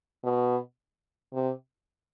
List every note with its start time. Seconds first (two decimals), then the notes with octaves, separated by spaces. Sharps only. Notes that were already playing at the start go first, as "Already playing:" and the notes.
0.24 B2
1.34 C3